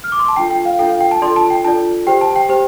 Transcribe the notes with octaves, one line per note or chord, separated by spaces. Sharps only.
F6
D6
C6
A5
D4 F4 A4 G5
G5
F5
D4 F4 A4 G5
F5
G5
A5
D4 F4 A4 D5 C6
A5
G5
D4 F4 A4 D5 A5
G4 C5 G5
A5
G5
G4 C5